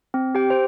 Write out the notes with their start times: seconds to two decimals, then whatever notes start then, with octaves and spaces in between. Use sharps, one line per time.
0.14 C4
0.35 G4 G5
0.50 C5